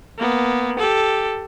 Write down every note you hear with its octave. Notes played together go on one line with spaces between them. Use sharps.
A#3 B3
G4 A4